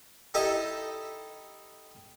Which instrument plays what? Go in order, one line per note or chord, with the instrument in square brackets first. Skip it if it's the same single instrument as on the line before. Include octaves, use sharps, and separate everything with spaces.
[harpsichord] D#4 E4 G4 A4 D#5 E5